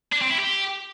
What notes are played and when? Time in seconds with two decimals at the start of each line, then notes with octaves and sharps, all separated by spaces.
0.13 D4
0.22 C4
0.30 E4
0.39 G4